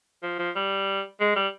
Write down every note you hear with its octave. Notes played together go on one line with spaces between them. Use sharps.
F3
F3
G3
G#3
G3